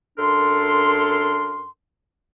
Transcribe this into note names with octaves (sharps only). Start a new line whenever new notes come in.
F#2 D4 A4 A#4 C6